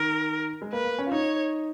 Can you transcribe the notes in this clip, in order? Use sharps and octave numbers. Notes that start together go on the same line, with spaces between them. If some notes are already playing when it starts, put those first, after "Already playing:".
Already playing: D#3 A#4
G#3
A#3 B4
A#3
C#4
F4
D#4 C#5